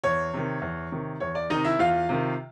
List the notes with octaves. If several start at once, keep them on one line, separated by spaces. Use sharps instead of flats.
E2 C#5
C3 D#3
E2
C3 D#3
E2 C#5
D5
C3 D#3 D#4 D#5
E4 E5
E2 F4 F5
C3 D#3